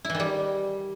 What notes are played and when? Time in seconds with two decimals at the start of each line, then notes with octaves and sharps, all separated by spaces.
0.05 E4
0.10 E3
0.15 D#3
0.20 G3